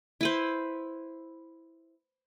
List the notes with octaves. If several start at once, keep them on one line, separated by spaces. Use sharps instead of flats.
E4 B4 C5